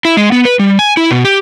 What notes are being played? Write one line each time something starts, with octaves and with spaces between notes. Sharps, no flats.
E4
G#3
B3
B4
G3
G#5
E4
B2
G4